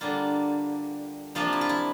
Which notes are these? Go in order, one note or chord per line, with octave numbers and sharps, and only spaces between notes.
D3 G3 A#3 D4 F4
C3 F3 A#3 D4 F4
E4
F4
E4